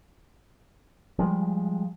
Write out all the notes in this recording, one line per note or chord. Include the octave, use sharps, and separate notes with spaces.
F3 G3 G#3